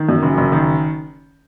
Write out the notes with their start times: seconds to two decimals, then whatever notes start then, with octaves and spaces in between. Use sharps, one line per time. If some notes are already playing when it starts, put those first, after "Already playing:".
Already playing: D#3
0.09 F#2
0.23 F#1
0.38 F#1
0.52 D#3